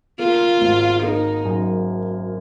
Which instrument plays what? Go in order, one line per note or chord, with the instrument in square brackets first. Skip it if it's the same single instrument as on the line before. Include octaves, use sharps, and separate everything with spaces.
[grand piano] A#3 [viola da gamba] F4
[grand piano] G#1
[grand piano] A#3 [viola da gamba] D#4
[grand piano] F#2